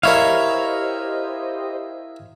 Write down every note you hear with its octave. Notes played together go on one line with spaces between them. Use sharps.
E4 G4 A#4 C5 C#5 D#5 F5